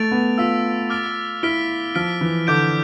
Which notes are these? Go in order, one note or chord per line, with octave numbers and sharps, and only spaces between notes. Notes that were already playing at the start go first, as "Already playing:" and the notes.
Already playing: A3 A6 D7 F7
B3
F4 E6 B6 F7
D6 F6 A6 D7
E4 F6 B6 D7 G7
F3 F6 B6 D7 G7
E3
D3 D6 G6 D7